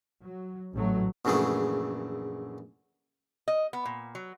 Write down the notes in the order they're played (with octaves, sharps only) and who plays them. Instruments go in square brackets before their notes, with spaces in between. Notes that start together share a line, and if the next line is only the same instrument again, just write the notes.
[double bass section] F#3
A1 G#2 F#3 A3
[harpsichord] A#1 F#2 C#3 E3 A3 G#4
[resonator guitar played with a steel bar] D#5
B3
A#2
F#3